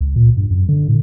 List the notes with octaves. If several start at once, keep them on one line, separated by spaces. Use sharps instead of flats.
C#2
A#2
G2
F#2
D3
A2